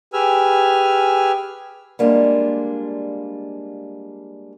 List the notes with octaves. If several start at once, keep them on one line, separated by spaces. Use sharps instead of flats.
G4 G#4 B4 G#5 E6 F6
G3 G#3 A#3 D4 F4